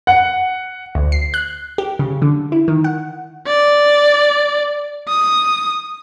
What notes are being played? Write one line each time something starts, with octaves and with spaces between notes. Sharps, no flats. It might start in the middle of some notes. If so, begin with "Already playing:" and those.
F#5
D2
C7
F#6
G4
C#3
D3
E4
D#3
F#5
D5
D#6